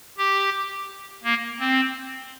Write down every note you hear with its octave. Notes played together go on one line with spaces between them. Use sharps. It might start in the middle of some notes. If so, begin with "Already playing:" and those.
G4
A#3
C4